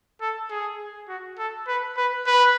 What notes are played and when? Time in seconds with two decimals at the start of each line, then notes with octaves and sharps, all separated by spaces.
0.21 A4
0.50 G#4
1.09 F#4
1.38 A4
1.68 B4
1.97 B4
2.27 B4